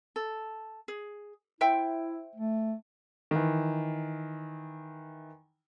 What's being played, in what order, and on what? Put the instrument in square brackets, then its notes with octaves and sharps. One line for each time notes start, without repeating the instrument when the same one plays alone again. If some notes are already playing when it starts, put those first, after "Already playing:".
[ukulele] A4
G#4
[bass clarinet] E4 [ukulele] C5 E5 G5
[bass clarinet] A3
[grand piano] D#3 E3